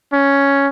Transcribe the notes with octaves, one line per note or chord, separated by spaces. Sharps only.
C#4